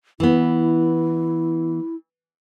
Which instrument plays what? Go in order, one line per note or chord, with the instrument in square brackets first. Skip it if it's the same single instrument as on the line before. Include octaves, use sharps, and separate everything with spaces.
[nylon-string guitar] E3 B3 [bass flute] E4